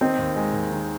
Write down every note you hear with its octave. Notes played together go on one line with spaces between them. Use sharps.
D#3 C4 D#4
D#2
G#3
D#2
D#3